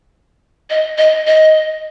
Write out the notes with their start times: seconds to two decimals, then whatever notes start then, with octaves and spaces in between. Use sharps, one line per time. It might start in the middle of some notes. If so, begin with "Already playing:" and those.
0.70 D#5
0.98 D#5
1.27 D#5